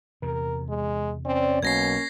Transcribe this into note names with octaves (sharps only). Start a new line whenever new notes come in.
E2 C3 A#4
G#3
C4 C#4 D5
B1 B2 A#3 C#4 G#6 A#6 C7